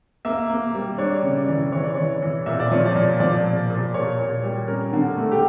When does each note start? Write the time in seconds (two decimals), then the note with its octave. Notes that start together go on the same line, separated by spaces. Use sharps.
0.25 A#3 E5
0.50 A#3
0.75 G3
0.98 D4 C#5
1.23 C#3
1.36 D5
1.48 E3
1.72 E3 C#5
1.83 D5
1.94 E3 C#5
2.22 E3
2.46 A#2 E5
2.60 D5
2.71 F3 C#5
2.86 D5
2.96 A#2
3.20 F3 D5
3.45 A#2
3.70 A#2
3.94 A#2 C#5
4.19 A#2
4.43 G3
4.68 C#4 A#4
4.93 D3
5.05 A#4
5.17 A3
5.32 G4